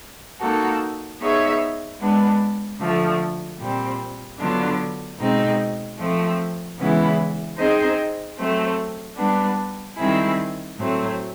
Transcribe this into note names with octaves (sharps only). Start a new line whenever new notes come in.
A#3 D#4 F#4 A4
B3 D#4 G#4 C#5 E5
G#3 B3 D4
D3 F3 A3
A#2 G3 C4
D3 F#3 B3 D4 F4
B2 G#3 C4 D#4
F3 A3 C4
C#3 E3 G#3 B3 E4
C4 D#4 G#4 C5 D#5
F#3 A3 C4
G3 B3 D4
D#3 G3 C4 E4 G#4
A2 F#3 A3 C4